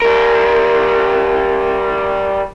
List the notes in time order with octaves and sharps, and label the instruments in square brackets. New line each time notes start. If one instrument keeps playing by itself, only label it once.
[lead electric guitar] G3 A#4